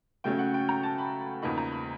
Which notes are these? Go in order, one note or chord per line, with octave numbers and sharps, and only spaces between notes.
C#3 F#3 A3 C#4 G5
F#5
G5
A#5
A5
B5
E2 C#3 F3 A#3 D#4 B5
A#5
B5